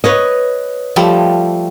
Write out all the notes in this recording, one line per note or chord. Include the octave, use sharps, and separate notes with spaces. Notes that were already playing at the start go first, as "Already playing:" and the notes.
B4 C#5 D#5
F3 G3 A3